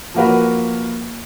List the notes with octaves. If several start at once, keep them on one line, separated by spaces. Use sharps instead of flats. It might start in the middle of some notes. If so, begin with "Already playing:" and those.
F3 A#3 F#4 A#4 B4